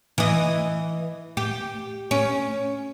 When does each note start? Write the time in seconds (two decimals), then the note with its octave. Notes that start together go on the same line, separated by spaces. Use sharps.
0.18 E3 D#5
1.37 G4
2.11 C#4